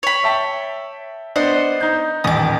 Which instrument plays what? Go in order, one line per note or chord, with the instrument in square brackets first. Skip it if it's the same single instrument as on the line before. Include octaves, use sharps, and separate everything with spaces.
[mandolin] C#5 B5
[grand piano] E5 G5 A5
[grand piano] B3 D4 [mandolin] C5 D#5 F#5
[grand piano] D#4 G6
[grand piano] D#1 A1 G#5 [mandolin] D6 D#6